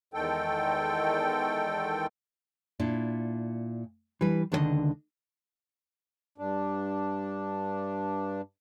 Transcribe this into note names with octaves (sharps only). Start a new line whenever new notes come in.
E2 D#3 G#3 A4 G5
A#2 D4 E4
E3 G3 D4 B4
C#2 D3 D#3 D4 A#4 D#5
G2 D4